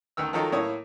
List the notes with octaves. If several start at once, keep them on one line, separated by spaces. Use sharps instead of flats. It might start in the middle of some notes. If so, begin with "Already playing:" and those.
D2 D#3 E6
D#3 F3 F#3 D#4 A4 A#4
A2 A#3 C#5 D#6